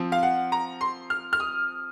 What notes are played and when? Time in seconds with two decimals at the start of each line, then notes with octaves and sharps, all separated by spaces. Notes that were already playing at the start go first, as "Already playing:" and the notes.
Already playing: F3 C4
0.12 F5
0.23 F#5
0.52 A#5
0.81 C6
1.10 F6
1.33 F6
1.40 D#6